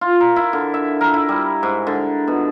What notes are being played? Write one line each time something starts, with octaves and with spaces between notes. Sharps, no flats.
F4
A#4
E4
D3
E5
A#4
E4
G3
G#2
D3
B2